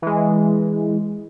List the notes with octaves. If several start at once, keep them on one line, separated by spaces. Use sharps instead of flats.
E3 G#3